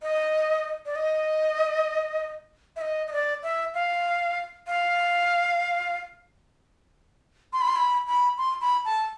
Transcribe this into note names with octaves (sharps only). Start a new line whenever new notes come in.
D#5
D5
D#5
E5
D#5
D#5
D5
E5
F5
F5
C6
B5
C6
B5
B5
C6
B5
A5